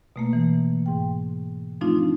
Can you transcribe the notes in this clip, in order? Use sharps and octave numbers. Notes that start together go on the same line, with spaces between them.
B2 A3 A#3
E3
G#2 G5
F3 A3 C4 D4 D#4 F4